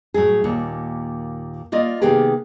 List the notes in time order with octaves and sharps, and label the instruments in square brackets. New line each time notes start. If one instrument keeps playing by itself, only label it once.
[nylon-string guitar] A2 F#3 E4 G#4
D#2 A#2
A#3 F4 D5 D#5
C3 D#3 A#3 B3 G4 G#4